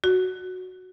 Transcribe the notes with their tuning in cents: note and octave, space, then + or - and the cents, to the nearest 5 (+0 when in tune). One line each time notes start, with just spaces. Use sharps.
F#4 -5